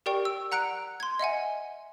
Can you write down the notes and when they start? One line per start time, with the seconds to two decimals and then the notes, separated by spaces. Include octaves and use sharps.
0.06 G4 A#4 D5 G5 C#6
0.25 E6
0.52 F#5 A#5 F#6 C#7 D7
1.00 C6 G#6
1.19 D#5 E5 F#5 G#5